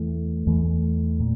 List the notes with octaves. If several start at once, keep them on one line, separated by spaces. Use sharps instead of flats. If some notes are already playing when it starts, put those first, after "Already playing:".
Already playing: E2 E3 A3
E2 E3 A3
A#2